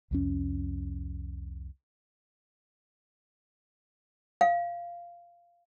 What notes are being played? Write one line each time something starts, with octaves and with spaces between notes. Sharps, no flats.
C2 F2 C#4
F5